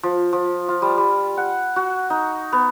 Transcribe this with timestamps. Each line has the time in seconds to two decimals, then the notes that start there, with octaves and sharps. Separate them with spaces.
0.03 F3
0.33 F3
0.68 F4
0.82 G3
0.97 G3
1.37 F#5
1.76 F#4
2.10 D#4
2.52 B3